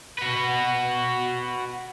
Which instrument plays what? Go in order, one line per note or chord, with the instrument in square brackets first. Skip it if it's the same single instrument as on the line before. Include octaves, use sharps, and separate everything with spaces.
[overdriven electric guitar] F#4 B4